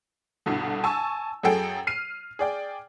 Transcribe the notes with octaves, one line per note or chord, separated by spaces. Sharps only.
C2 G2 B2 D3
G#5 A5 C#6 E6
F#2 F#3 G#4 A4 G5
F6 C7 D#7
G#4 D5 G5